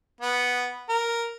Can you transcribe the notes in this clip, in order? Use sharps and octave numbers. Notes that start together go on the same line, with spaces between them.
B3
A#4